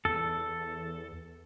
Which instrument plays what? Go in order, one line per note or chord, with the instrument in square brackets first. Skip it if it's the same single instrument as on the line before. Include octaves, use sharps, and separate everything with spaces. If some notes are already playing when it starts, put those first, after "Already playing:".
[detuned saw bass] E2 [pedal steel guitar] A4